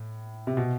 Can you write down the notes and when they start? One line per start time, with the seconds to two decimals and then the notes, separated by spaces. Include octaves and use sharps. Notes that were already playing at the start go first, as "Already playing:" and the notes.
Already playing: A2
0.47 C3
0.57 B2